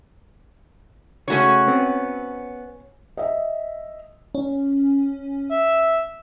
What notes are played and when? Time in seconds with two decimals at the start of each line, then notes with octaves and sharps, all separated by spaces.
1.28 C#3 A3 C#4 F#4 C#5
1.68 B3 C4
3.17 D#5 E5
4.35 C#4
5.51 E5